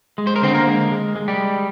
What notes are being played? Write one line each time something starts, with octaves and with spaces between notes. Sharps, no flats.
G#3
C5
A#4
D3 C4 C5
A#3 A#4
G#3
G#3
G#3
G3 G4
G#3